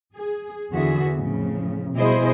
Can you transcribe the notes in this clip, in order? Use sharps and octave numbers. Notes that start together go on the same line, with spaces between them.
G#4
E2 D3 B3 F#4 G#4 E5
F2 A2 C#3
B2 G3 E4 G#4 C5 D#5